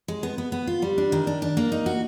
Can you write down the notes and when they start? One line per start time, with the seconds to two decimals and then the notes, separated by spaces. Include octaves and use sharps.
0.08 G#3
0.23 B3
0.38 B3
0.52 B3
0.67 F4
0.82 G3
0.98 D4
1.12 D#3
1.27 D4
1.42 D4
1.57 A#3
1.72 D#4
1.86 F#4